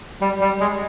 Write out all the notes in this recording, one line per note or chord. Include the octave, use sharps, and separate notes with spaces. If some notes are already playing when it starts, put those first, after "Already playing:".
G3
G3
G#3